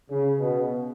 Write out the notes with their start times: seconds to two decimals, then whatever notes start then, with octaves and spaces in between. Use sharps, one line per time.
0.10 C#3
0.39 B2